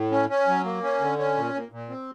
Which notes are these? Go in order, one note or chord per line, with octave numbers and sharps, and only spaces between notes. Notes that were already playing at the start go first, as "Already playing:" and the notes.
Already playing: A2
C#4
C#4
F#3
A#3
C#4
D3
C#4
A#2
A#2
A#2
C4